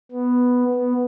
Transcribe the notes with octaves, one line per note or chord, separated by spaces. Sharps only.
B3
B3